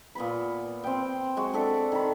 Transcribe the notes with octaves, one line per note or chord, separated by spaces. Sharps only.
A#2 B3 B4 B5
C4 G5
G#3 F#4
D4 A4 D5 E5
D#3 B5